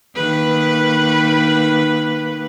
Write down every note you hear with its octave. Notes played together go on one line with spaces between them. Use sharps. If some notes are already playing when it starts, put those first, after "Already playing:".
D#3 A#3 B4